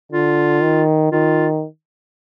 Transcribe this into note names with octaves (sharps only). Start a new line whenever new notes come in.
D3 F4
D#3
D#3 F4